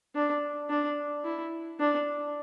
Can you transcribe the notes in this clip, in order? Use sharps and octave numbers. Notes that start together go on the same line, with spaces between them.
D4
D4
E4
D4